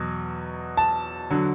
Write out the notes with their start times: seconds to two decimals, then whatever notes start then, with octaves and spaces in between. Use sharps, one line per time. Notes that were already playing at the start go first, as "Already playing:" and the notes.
Already playing: E2 B2 F#3
0.77 A5
1.30 D3 F#3